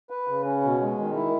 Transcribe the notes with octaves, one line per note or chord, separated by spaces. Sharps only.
B4
C#3
C#4
B2
G#3
D#3
E4